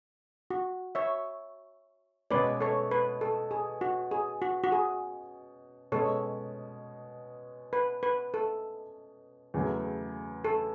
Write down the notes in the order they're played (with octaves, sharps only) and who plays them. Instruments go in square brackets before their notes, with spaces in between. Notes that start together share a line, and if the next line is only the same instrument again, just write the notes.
[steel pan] F#4
C#5 E5
[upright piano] B2 G#3 C#4 [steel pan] B4 D5
[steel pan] A4 C#5
B4
A4
G#4
F#4
G#4
F#4
F#4
G#4
[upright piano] B2 G#3 C#4 [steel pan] A4 C#5
[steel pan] B4
B4
A4
[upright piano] E2 C#3 F#3 A3
[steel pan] A4